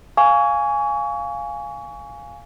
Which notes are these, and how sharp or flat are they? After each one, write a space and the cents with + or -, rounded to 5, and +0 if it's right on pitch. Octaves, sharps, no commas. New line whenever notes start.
F5 +0 G#5 +0 C#6 +30